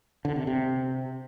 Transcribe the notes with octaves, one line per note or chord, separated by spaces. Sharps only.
D3
C3
C3